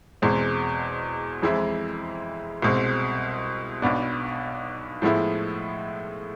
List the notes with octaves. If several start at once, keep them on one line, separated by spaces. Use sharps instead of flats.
E2 B2 G#3 C4
F2 E3 G#3 C4 E4
C2 B2 G#3 C4
B1 B2 B3 D4
A2 F3 G#3 B3 E4